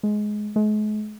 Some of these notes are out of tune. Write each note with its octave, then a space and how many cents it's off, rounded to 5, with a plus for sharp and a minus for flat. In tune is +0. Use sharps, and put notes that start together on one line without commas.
G#3 +15
G#3 +40